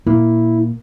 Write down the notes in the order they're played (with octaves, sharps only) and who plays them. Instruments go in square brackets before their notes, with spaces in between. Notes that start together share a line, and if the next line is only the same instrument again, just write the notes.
[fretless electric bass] A#2 A#3 [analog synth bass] E4